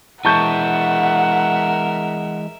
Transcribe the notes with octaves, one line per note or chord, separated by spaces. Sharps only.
E3 G#3 A#4 E5 F#5 A5 C#6 G6